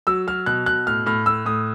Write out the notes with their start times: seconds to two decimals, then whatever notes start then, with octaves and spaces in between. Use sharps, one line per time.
0.07 F#3 E6
0.27 F#3 F6
0.46 B2 F#6
0.66 B2 F#6
0.86 A2 F6
1.06 A2 F6
1.26 A2 E6
1.45 A2 D#6